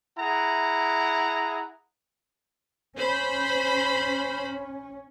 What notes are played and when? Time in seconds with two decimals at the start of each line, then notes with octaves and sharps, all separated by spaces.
0.19 E4 G#4 F#5 A#5
2.97 C#4 C5 B5